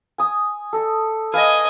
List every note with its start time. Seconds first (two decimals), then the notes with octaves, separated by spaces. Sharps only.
0.18 G#5 D#6
0.73 A4 D#5
1.34 B4 D5 D#5 F5 G#5